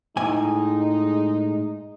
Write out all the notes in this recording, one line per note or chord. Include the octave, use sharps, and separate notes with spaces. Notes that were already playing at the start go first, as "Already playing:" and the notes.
A2 G#3 D#4 G#5